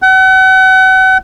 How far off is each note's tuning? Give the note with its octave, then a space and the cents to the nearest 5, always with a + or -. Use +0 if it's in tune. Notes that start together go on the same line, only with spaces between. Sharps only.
F#5 +35